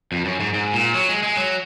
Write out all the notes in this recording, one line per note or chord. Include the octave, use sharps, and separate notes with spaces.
F2
F#2
G#2
G#2
A#2
F#3
G#3
G#3
F#3